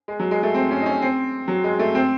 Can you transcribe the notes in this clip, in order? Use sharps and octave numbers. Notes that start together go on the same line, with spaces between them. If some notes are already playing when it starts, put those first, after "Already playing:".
G#3
F#3
G#3
A3
C4
C#4
D#4
C#4
C4
F#3
G#3
A3
C4